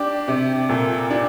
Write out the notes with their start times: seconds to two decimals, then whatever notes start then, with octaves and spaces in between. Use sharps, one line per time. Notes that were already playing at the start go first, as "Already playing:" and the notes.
Already playing: D4 G4
0.28 C3
0.69 A#2 A4
1.10 D4 G4